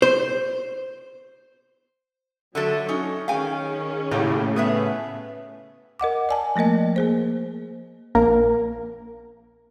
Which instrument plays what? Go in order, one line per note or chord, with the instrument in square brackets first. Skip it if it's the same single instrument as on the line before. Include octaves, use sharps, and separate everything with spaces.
[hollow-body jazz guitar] C5
[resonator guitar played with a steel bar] D3 A3 A4 [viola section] F#3
[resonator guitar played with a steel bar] C#4 D#4
[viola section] D#3 C#4 G#4 [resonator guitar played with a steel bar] F5 G5 G#5
[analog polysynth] A2 C#3 [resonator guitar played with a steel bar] A#3 G4
[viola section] B3 [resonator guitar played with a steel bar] G#4 B4 E5
[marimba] A#4 D#5 F#5 D6
D5 G#5 A5
F3 A3 A#3 A#4 D#5
A#3 G#4 C5
[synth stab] A#1 A#3 A#4